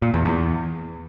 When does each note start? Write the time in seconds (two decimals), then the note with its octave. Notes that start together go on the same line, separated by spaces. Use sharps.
0.02 A#2
0.14 E2
0.25 E2